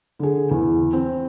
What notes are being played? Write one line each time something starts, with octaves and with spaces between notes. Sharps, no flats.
D3 G#4
E2
C4